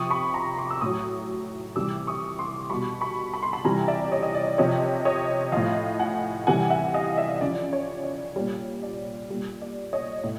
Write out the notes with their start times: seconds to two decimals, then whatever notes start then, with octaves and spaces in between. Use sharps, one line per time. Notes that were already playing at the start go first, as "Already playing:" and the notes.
Already playing: C3 F3 C#6 D#6
0.10 B5 C#6
0.34 A#5 C6
0.58 C6 D6
0.71 E6
0.81 A2 F#3 C#6 D#6
1.76 C3 E3 G3 D6 E6
2.07 C#6 D#6
2.39 C6 D6
2.70 B2 G3 B5 C#6
3.01 B5 C#6
3.34 B5
3.43 C6
3.53 A5 B5
3.64 C3 E3 G3 G#5 A#5
3.88 D5 E5
4.05 D5
4.12 C#5 D#5
4.23 D#5
4.35 D5
4.58 C3 F3 C#5 D#5
5.05 C#5 D#5
5.52 A2 F3 D#5 F5
5.99 F#5 G#5
6.47 C3 E3 G3 F#5 G#5
6.70 E5 F#5
6.94 D#5 F5
7.18 D5 E5
7.41 C#3 F3 D5
7.73 C#5
8.03 D5
8.36 A#2 G3 C#5
8.83 D5
9.30 A#2 G3
9.62 D5
9.93 C#5 D#5
10.24 A2